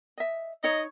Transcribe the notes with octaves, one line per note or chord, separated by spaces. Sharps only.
D#5 E5
D#4 C#5 D#5